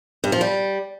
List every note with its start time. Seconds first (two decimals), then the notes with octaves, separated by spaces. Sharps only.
0.24 G2
0.32 F3
0.41 G3